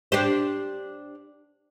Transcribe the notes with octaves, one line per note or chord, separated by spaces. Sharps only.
D4 G4 C5